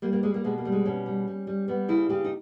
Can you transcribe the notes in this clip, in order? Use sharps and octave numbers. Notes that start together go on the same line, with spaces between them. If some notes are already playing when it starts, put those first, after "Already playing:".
G3 A#3
A#3
G3 G#3
A#3
B2 G#3
A#3
G3
G#3
B2 C#4
G3
G3
G3
G3 B3
C#3 E4
C#3 G4
D#4